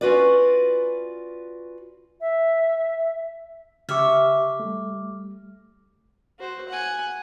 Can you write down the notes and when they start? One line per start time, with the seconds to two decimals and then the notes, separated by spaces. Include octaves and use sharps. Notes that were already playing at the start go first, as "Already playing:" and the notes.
0.01 C#4 F4 F#4 B4 D5
2.21 E5
3.89 C#3 G4 E5 C#6 D6 F6
4.60 G3 A3
6.39 F#4 C5
6.69 F#5 G#5